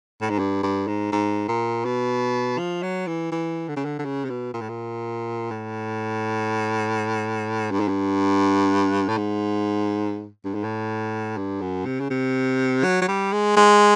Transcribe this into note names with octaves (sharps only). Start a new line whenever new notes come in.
A2
G#2
G2
G2
G#2
G#2
A#2
B2
F3
F#3
E3
E3
D3
C#3
D3
D3
C#3
C3
B2
A#2
A2
A#2
A2
G2
G#2
G2
A2
G#2
G2
G#2
A2
G2
F#2
C3
C#3
C3
F#3
F#3
G3
G#3
G#3